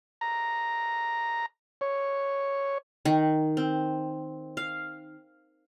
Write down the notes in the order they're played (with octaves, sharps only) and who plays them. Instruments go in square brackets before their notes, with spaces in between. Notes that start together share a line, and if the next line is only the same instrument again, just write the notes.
[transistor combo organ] A#5
C#5
[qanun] D#3
C4
F5